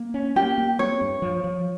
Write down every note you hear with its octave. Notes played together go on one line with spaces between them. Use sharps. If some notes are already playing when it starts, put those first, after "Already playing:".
Already playing: A#3
C#4
A#3 G4
A#3
C4 C#5
G2
F3
F3